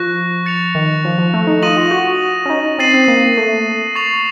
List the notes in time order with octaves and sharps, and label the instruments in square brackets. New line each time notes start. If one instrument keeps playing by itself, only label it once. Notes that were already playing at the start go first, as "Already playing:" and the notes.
Already playing: [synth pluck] F3 [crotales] C#6 F#6 A#6
[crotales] A6 C#7 F7
[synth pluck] D#3
F3
F3
A3
D#4
[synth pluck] F4 [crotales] D#6 A#6 D#7 F#7
[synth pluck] F4
F#4
C#4
D#4
[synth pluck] C4 [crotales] A6 C7 D#7 F#7
[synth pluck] C4
A#3
A3
[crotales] C#6 A6 C7 F7